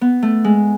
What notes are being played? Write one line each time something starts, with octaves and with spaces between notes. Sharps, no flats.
B3
A3
G#3